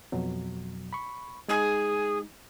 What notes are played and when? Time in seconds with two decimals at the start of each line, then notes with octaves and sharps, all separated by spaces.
0.12 F2 B2 F#3
0.93 B5 C#6
1.48 G#3 D#4 G#4